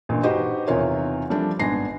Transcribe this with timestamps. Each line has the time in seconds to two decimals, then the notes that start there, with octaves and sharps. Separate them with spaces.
0.09 A1 G2 A#2
0.23 D#4 F#4 G4 B4 C5 D#5
0.67 E2 C3 D#3 F4 A#4 C#5
1.30 F3 G3 A3 C4 D4
1.59 G#1 B3 D4 G#5 A#6 C7